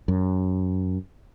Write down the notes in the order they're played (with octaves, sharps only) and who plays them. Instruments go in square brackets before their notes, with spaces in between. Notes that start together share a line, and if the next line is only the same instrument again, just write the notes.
[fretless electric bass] F#2